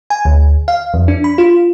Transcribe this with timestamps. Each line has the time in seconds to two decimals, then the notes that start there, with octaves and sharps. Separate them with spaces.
0.10 G#5
0.25 D2
0.68 F5
0.94 F2
1.08 D4
1.24 B5
1.38 F4